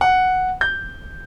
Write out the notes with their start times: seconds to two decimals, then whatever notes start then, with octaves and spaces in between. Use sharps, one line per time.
0.01 F#5
0.61 G6